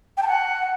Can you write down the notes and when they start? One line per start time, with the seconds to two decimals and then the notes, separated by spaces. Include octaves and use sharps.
0.17 G5
0.23 A5
0.28 F#5